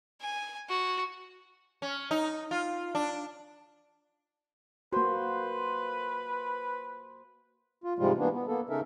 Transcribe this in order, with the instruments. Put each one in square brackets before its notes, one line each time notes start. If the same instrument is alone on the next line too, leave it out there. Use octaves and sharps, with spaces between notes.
[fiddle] G#5
F#4
[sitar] C#4
D#4
F4
D4
[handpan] A#3 F#4 [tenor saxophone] B4 [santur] C5
[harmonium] F4
G#2 C3 F3 G3 G#3 F4
E3 A#3 B3 D4
B3
A#3 B3 A4
C#3 C#4 D#4 A4 A#4 E5